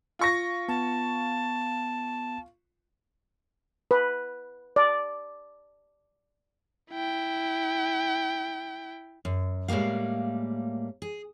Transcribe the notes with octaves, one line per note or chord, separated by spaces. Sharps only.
F4 C#6 A#6
B3 A5
B4
D5
E4 G5
F#2
A2 G3 G#3 A#3 F5
G#4